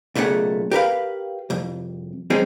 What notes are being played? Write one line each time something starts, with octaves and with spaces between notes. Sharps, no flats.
B1 A#2 C#3 A3 F#5
G4 A#4 B4 F5
C2 F2
G3 G#3 C4 C#4 D#4